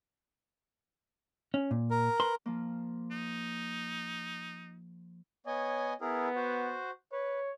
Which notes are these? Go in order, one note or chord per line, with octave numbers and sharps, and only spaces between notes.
C#4
A#2
A#4
B4 C6
F3 A#3
D#4
B3 C#5 D#5 G#5
B3 E4 G#4 A#4
F#4 C5
B4 C#5